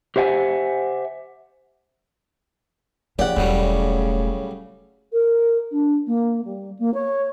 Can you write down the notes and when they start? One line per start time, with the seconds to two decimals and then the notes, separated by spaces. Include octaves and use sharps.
0.16 G4 C5 E5 F#5 G#5
3.19 C#3 F3 G4 D5 F#5
3.37 E1 A2 F#3 G3 A3
5.12 A#4
5.71 D4
6.06 A#3
6.44 G3
6.78 A#3
6.93 C#5